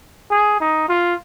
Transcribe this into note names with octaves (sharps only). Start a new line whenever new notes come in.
G#4
D#4
F4